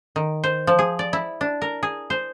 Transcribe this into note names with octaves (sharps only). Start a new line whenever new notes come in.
D#3
C5
F3
G#4
D5
E4
D4
A#4
G#4
C5